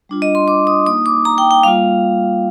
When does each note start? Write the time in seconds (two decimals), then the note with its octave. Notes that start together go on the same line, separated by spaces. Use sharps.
0.09 G3 D4 F4
0.22 D#5
0.35 C6
0.48 D6
0.67 D#6
0.86 A#3 D#4 D#6
1.06 D6
1.25 A#5
1.38 G5
1.51 G5
1.63 G3 A#3 F4 F5